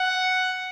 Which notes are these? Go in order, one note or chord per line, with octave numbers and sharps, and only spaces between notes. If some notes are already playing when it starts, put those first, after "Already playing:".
Already playing: F#5